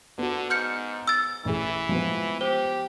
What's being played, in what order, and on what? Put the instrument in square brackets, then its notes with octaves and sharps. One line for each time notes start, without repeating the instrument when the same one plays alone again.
[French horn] D3 [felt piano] B3 F#4
[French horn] G#2 [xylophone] F6 G6 C#7
[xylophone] E6 A6
[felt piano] A1 G#4 [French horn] E3
[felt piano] F3 G#3 B3
[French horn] G4 [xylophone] C5